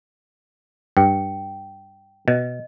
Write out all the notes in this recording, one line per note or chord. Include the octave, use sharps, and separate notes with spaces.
G2 G5
B2 D#5